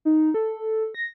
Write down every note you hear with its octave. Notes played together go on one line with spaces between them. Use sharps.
D#4
A4
A#6